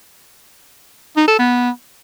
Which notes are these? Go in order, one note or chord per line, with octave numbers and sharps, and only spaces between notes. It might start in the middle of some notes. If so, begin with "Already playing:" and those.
D#4
A4
B3